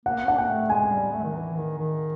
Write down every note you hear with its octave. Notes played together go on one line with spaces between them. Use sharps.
A#3 F#5
D4 F#5
A#3 G5
A3
G#3 G#5
G3
A3
D#3
E3
D#3
D#3